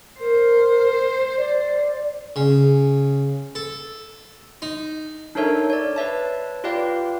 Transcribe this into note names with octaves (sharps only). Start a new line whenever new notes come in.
A#4 C5
D5
C#3
A4
D#4
D4 D#4 A4 A#4 C#5 E5
C#5 D5
B4 C#5 E5 A5
F4 G4 B4 D5 F5 G5